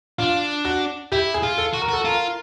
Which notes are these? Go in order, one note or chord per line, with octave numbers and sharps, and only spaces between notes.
D4 F4
F#4
E4 G4
G#4
F4
A4
F#4
A#4
F#4 A4
F4 A#4